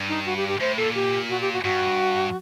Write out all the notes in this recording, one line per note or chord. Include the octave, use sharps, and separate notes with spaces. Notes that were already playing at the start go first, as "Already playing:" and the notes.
Already playing: G2
D#4
F#4
G4
G4
A2 C5
A#2 A4
G4
F#4
G4
F#4
G2 F#4